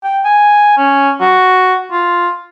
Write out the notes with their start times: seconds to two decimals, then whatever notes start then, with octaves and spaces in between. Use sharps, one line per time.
0.04 G5
0.25 G#5
0.77 C#4
1.21 F#4
1.92 F4